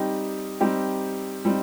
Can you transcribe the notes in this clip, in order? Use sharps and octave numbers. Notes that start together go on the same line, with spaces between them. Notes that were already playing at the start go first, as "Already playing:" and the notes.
Already playing: G3 C4 D#4 G4
G3 C4 D#4 G4
G3 C4 D#4